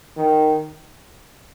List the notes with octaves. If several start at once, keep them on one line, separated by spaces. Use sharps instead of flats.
D#3